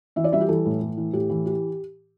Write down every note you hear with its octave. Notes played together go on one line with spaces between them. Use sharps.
E3 E5
D5
G3 E5
G4
E3 A4
A2
A2
E3
A2 G4
E3
G4